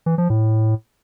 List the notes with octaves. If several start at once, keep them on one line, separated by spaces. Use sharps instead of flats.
E3
F3
A2